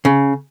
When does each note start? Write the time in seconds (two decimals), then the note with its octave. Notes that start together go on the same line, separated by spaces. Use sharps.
0.05 C#3